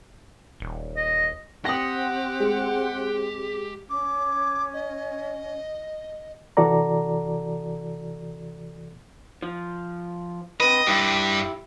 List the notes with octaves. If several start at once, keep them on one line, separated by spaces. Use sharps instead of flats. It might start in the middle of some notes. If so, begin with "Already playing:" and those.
D#1
D#5
C4 G4 F#5 D#6 A#6
G#3
C#4 D6
D#5
C3 E3 F#4 A4 D5 A#5
F3
C4 B4 D#5
G2 E4 G4